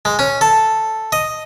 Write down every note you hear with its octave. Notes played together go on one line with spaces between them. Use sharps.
G#3
C#4
A4
D#5